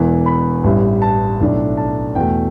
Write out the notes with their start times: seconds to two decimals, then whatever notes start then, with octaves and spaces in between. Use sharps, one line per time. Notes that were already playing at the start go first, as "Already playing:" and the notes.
Already playing: E1 E2 E3
0.26 B5
0.64 A1 G2 G3 E4
1.02 A5
1.41 B1 A2 A3 D4
1.77 A5
2.15 E2 B2 A3 G5